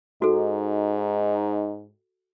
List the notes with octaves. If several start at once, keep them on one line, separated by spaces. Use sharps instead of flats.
G#2 D#4 F#4 A4